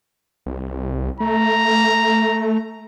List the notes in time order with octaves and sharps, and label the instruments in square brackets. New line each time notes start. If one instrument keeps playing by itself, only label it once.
[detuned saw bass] C2
[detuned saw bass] A3 [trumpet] A#5